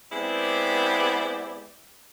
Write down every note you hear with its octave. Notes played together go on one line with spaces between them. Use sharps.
G#3 B3 C4 E4 G4 D5